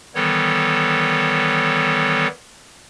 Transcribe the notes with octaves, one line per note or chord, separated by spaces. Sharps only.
D#3 E3 G3 B3 A4 C#5